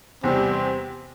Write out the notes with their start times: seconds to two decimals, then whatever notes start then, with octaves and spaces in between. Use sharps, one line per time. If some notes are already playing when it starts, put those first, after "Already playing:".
0.24 E2 C3 G3 C4